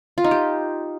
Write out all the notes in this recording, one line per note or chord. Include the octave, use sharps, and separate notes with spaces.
F4
D#4
G4